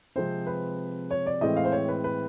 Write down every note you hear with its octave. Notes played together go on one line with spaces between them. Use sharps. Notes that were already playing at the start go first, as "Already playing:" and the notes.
C3 F3 G#3 C4 C5
B4
C#5
D5
A2 E3 G#3 C4 D#5
F5
C5
C#5
B4
B4